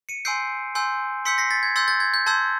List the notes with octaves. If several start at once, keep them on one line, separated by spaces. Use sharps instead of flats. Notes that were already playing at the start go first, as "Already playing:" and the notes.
C#7 D#7
G#5 C6 E6 G6 C7 D7
G#5 C6 E6 G6
C6 E6 G6 B6 C#7
A#6 C7
A6 B6
G#6
C6 E6 G6 A6
G6 A6
G#6
G6
A5 C6 E6 G6 G#6